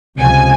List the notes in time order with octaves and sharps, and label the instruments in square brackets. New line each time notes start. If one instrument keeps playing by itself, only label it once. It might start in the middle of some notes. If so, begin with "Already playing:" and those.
[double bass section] C#2 C3 F3 [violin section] G#5